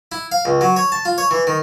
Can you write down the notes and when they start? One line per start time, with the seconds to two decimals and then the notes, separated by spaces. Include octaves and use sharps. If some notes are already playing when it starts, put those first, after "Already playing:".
0.12 E4
0.32 F5
0.45 C#2
0.61 F#3
0.76 C#5
0.92 A5
1.05 F4
1.18 C#5
1.31 E3
1.47 D#3